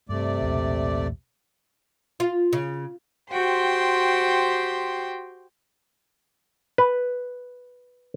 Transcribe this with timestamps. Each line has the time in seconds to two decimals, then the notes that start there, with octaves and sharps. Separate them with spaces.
0.09 G2 C3 A3 D5
0.41 B1 E2 A#2
2.20 F4
2.53 C#3
3.32 F#4 G4 C5 G5 C6
6.78 B4